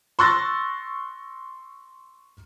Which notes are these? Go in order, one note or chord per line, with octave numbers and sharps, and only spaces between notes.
C6 C#6 E6 F#6 A6 A#6